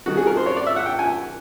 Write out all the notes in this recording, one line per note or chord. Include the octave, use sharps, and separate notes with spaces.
C3 D#3 G3 F#4
G#4
A#4
C5
C#5
D5
E5
F#5
G5
G#5